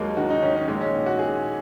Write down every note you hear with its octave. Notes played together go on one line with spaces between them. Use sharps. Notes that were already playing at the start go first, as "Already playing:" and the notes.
Already playing: D#2 F#3 G#3 A#3
D#3 F#4
D#4
D#3 C#4
C#4
A#1 G#3
C#4
A#2
F#4
A#2 G#4